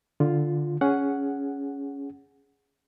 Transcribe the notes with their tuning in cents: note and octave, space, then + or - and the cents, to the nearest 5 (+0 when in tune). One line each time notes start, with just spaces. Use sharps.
D3 +0 F4 +0
C#4 +10 G#4 +0 F#5 +0